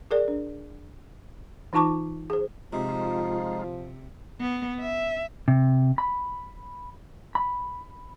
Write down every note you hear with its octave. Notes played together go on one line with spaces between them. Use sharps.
G#4 A#4 D5
D4
E3 D#4 F4 A5 C#6 D6
G#4 C5
C3 F3 G#3 D#4 F4
B3
E5
C3
B5
B5